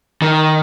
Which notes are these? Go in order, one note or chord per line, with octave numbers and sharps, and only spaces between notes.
D#3